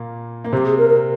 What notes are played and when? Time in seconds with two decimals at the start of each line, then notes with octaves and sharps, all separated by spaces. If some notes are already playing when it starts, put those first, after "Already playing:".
Already playing: A#2 A#3
0.44 A#3
0.52 C3 C4 G4
0.65 G#4
0.78 A#4
0.90 A#4